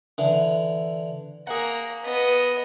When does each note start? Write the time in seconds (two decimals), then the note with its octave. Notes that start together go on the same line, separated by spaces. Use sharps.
0.18 D3 E3
1.47 A#3 G#4 F#5 A#5
2.04 B3 D#5